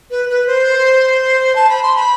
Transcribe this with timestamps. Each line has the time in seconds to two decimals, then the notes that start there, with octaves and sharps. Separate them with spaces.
0.10 B4
0.29 B4
0.46 C5
1.55 A5
1.69 B5
1.82 C6
1.96 B5